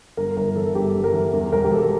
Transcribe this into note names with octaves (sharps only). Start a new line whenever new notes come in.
G1 A#4
G1 A#4
E3 A4
G1 G4
G1
A#4
E3
E2
E1 A#4
G4
E1 A4